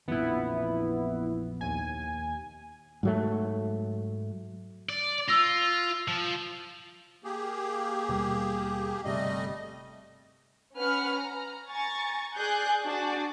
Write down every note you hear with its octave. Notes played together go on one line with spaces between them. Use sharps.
A#1 F2 E3 B3 E4
D#2 G#5
G#2 F#3 A3
D5
F4 E6 A#6
F3
A#3 G4 G#4
D#2 B2 G3
G1 C3 G3 A3 D#5
C#4 B4 F#5 F6
A#5
G#5 A#5 C#6 A6
G#4 D5 G#5 F#6 G6
D4 F#4 G#4 D5